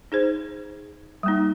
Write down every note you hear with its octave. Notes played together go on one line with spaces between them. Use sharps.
D#4 G#4 C5
G3 A#3 D#4